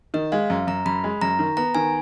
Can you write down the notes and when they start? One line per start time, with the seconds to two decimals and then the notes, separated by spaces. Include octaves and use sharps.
0.14 D#3 D#5
0.32 G#3 F5
0.50 F#2
0.67 F#2 A#5
0.86 F#2 B5
1.04 G#3
1.21 F#2 A#5
1.39 D#3
1.57 B3 A#5
1.75 D#3 G#5